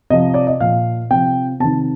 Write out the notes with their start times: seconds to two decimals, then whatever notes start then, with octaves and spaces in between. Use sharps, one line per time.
0.10 C3 F3 D#5
0.34 D5
0.47 D#5
0.61 A#2 F3 F5
1.10 C3 F3 G5
1.60 C3 D#3 A5